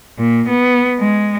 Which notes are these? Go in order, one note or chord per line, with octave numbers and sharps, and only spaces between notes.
A#2
B3
G#3